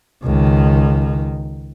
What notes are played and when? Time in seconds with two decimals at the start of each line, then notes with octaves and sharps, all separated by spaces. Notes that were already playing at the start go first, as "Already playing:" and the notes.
0.24 C#2 D#3